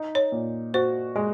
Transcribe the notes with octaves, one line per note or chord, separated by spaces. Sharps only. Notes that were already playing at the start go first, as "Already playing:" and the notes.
Already playing: D#4
C#5
A#2
F#4 C5
G#3